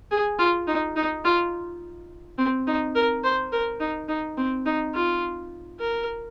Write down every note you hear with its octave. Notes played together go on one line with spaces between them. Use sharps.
G#4
F4
D#4
D#4
F4
C4
D#4
A#4
C5
A#4
D#4
D#4
C4
D#4
F4
A#4